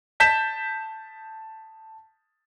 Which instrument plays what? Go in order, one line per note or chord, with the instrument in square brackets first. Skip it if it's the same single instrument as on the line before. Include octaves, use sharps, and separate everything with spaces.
[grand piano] A5 G6 B6 E7